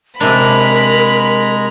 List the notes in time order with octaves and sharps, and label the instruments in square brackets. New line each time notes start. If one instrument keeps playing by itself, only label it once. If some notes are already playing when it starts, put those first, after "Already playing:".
[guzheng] C3 D4 [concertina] G#3 A#5 [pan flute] A#4 [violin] B5